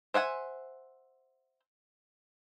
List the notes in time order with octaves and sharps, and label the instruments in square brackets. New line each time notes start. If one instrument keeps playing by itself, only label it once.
[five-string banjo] C5 E5 F#5 G#5